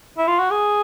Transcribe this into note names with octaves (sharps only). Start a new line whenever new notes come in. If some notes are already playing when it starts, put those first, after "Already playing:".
E4
F4
F#4
G#4